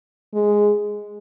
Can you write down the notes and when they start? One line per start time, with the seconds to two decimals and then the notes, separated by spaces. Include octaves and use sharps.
0.34 G#3